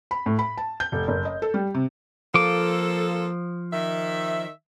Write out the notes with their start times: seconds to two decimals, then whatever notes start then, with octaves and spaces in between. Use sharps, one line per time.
0.11 B5
0.26 A2
0.39 B5
0.58 A5
0.80 G6
0.92 F1
1.08 F#1
1.25 D#5
1.42 A4
1.54 G3
1.74 C3
2.34 F3 A#3 F4 A4 D6
3.73 D#3 E5